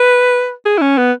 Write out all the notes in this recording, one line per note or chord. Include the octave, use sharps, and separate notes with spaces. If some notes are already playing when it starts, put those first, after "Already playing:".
Already playing: B4
G#4
E4
C#4
B3